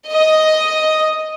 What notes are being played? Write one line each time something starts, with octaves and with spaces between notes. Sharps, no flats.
D#5